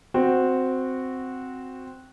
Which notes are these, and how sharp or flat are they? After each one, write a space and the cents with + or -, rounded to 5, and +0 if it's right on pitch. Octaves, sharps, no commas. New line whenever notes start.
C4 -5 F#4 -10